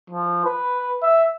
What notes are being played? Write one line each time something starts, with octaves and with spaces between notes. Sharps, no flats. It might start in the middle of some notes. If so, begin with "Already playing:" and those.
F3
B4
E5